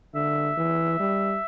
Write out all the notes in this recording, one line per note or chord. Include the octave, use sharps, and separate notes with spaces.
D3 E5
E3
G3